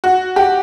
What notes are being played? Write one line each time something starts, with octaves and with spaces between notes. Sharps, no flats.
F#4
G4